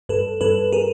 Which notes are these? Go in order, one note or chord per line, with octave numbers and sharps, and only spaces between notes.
G2 A4 B4
G2 A4 B4
G#4 A#4